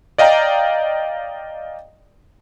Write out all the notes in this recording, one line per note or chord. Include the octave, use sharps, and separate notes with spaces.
D5 D#5 F5 G5 A#5